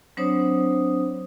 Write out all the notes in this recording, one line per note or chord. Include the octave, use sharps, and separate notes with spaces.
F#3 C4 D4 C5 C#5 D#6